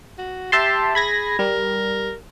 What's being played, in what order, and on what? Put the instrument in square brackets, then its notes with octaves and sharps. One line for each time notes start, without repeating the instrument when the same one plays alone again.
[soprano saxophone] F#4
[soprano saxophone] G4 [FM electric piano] E5 A5 C6
[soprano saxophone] G#4 [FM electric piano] B5 G#6 A#6
[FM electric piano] G3 [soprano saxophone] A#4